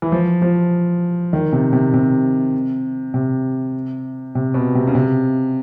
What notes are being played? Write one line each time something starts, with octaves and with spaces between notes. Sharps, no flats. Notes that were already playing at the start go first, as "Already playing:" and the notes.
E3
F3
F3
D#3
C3
C3
C3
C3
C3
B2
C3
C#3
C3